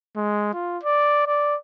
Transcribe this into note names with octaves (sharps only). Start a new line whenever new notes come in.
G#3
F4
D5
D5